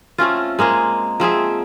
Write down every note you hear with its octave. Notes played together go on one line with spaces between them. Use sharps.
A3 C4 C#4 F4
G#3 A#3 C4 G#4
F3 C4 G#4 E5